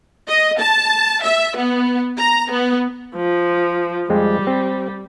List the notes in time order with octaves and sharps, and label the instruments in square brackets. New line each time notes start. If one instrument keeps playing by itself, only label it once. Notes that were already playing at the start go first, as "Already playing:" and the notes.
[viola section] D#5
A5
E5
B3
A#5
B3
[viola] F3
[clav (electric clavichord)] F2 G#3 C4 [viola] G3
[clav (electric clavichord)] C4